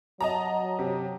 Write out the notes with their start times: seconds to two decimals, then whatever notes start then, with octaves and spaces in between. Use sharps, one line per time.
0.21 F#3 D#5 A5 A#5
0.79 C3